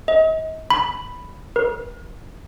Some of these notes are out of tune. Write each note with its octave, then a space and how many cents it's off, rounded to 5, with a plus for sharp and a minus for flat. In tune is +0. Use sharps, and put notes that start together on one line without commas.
D#5 +40
B5 +5
A#4 +45